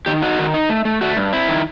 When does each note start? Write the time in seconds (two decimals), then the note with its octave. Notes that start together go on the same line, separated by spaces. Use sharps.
0.06 D#3 G4
0.22 D#4 F#4
0.39 D#3
0.54 D#4
0.69 A3
0.85 A3
1.01 A3 F#4
1.17 G2
1.33 C4 E4
1.48 D#3